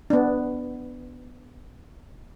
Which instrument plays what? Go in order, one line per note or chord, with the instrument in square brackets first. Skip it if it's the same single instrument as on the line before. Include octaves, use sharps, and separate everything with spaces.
[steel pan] B3 D4